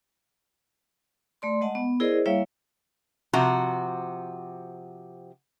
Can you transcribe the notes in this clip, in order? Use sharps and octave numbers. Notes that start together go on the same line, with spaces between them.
A3 D5 C6
G#3 D#5 F#5 A5
B3
E4 G#4 A#4 C5 D5 D#5
G3 A#3 E4 C#5 E5 F5
C3 F3 F#4 A#5